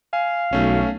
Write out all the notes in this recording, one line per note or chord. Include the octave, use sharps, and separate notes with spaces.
F5 G#5
B1 A3 C#4